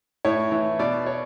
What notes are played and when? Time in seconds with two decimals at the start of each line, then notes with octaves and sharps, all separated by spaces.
0.25 A2 C#5
0.52 E3
0.79 B2 D5
1.07 C#5